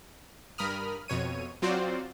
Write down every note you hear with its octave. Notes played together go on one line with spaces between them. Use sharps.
G2 A#4 B5 D#6 F6
F2 B2 C#5 D#7
F#3 C4 F4 F#4 C5 D5